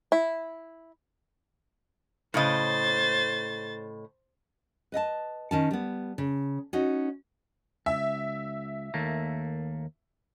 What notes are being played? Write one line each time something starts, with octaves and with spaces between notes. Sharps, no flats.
E4
A2 C#3 C5 D#5 A6
B4 D#5 E5 A5
D#3 C#4 A5
G3 B3
C#3
C#4 D#4 F#4
C#2 E5
D#2 A3 A#3